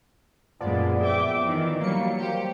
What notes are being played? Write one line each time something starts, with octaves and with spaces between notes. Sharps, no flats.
F#2 A#2 F3 G#3 B3 D5
E5 G5 D6
D#3 E3
F#3 G3 A#3 C#7
G4 C5